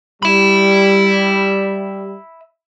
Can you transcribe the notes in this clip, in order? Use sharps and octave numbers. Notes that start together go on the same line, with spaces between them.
G3 E5 B5